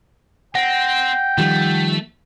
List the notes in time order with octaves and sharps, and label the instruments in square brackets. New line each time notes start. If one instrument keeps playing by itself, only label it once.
[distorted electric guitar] C4 [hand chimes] F#5 A#6 [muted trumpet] G5
[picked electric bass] D#3 F3 G3 [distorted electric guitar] A3